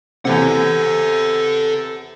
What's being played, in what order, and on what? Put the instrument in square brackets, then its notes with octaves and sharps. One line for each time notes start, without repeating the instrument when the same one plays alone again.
[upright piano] E2 C3 [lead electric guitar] A4 F#5